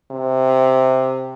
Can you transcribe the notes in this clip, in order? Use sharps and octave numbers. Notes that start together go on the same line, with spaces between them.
C3